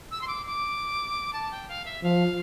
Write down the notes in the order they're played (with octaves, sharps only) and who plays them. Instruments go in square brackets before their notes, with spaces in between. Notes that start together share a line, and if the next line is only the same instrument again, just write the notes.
[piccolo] E6
C6
D6
D6
A5
G5
F5
E5
[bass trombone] F3 [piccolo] F5